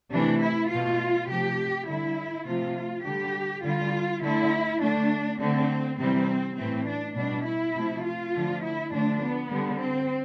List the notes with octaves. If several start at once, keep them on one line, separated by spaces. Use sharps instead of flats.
C3 E3 A3 D4
E4
B2 A3 F4
C3 F3 A3 G4
D3 G3 E4
C3 F3 A3 F4
D3 G3 G4
D3 G3 F4
D3 A3 E4
D3 A3 D4
D3 A3 C4
C3 E3 G3 C4
A2 E3 A3 C4
D4
B2 G3 D4
E4
C3 F3 A3
F4
D3 F3 A3
E4
D3 F3 A3 D4
B3
D3 G3
C4